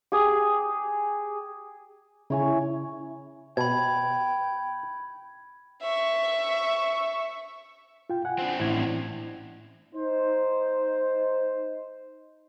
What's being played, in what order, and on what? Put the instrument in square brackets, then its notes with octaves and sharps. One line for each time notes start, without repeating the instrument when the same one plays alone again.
[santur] G4 G#4
[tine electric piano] C#3 [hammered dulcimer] E4 C#5 G#5
[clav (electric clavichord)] B2 [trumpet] G5 [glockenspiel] B5 G#6
[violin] E5 C#6
[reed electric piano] F4 G5
F#5 G#5
[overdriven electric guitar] C4 D4
[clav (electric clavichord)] A1 [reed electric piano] E4 G#6
[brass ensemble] D#4 C5